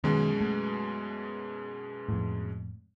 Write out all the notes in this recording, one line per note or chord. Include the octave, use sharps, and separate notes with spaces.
F#2 B2 D#3 G#3
A3
F2 A2